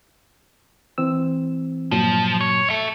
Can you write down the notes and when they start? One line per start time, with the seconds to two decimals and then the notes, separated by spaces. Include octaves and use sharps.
0.98 E3 C4 E6
1.91 G2 A#2 F3 F#3
2.41 C#5
2.70 A4 E5